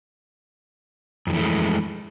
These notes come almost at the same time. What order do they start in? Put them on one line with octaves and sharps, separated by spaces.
F2 F3 E3 A3 G#3